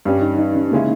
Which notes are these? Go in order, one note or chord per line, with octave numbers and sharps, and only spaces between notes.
G2 G3 C#4
D#4
D#4
C#4
C#3 G#3 A#3 C#4 E4